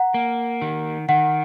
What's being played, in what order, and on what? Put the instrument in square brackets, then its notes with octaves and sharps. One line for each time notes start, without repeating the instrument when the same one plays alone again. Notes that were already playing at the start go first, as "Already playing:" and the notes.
Already playing: [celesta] F#5 A#5
[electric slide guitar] A#3
D#3
[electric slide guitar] D#3 [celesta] F#5